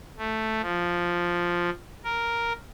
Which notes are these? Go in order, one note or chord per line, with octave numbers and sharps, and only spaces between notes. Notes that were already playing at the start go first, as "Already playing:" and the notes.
A3
F3
A#4